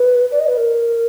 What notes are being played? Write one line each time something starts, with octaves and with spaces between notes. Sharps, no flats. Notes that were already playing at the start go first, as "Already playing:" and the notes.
Already playing: B4
D5
D#5
B4
A#4